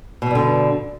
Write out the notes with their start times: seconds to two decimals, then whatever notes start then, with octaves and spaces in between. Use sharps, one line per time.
0.22 B2
0.26 E3
0.31 G2
0.35 D3